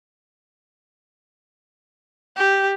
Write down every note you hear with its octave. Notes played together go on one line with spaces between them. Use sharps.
G4